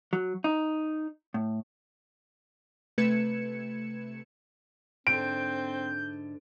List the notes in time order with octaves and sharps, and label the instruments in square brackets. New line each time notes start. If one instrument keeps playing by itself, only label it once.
[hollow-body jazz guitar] F#3
D#4
A2
[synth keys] C3 A3 B4 G#6 C#7 E7
[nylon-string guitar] G#2 D3 [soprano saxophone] C4 [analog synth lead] G6 [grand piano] D7